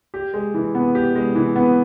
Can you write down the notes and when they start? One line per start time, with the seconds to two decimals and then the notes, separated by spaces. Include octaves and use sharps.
0.14 G4
0.34 G#3
0.54 E3
0.75 B3
0.95 G4
1.15 G#3
1.35 E3
1.56 B3